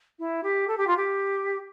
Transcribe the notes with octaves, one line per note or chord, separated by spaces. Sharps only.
E4
G4
A4
G4
F4
G4